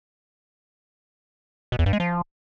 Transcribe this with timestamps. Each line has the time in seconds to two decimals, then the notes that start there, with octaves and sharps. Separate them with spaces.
1.72 B2
1.79 E2
1.86 G2
1.93 G#3
2.00 F3